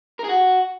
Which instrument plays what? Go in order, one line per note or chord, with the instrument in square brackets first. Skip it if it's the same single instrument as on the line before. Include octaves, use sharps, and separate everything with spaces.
[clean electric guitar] A#4
G#4
F#4